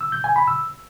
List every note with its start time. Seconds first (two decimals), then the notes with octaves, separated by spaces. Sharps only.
0.01 E6
0.12 G6
0.24 G#5
0.36 B5
0.48 E6